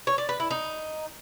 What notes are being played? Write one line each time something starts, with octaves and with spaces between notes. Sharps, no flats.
C#5
D5
B4
E4
D#4